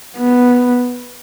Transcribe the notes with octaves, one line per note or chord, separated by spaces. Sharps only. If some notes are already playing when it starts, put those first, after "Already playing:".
B3